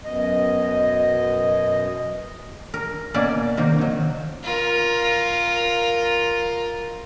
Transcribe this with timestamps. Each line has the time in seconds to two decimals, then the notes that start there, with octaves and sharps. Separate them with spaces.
0.04 F#2 B2 D#5
2.74 A#4
3.14 B2 A#3 C#4 D5 E5
3.57 C3 D#3 A#3
3.78 D#3 F#3
4.44 F4 A#4